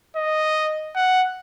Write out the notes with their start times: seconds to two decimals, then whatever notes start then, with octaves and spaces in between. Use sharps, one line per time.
0.16 D#5
0.95 F#5